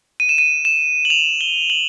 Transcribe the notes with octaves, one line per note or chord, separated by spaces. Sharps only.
D#7
E7
D#7
E7
F#7
F7
G7
F#7